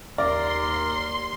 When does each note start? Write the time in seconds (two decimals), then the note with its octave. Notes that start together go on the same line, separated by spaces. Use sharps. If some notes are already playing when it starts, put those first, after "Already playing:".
0.18 D#2 A#4 D5 C6